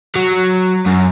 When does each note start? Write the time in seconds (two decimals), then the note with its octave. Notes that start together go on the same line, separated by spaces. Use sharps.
0.16 F#3
0.86 F#2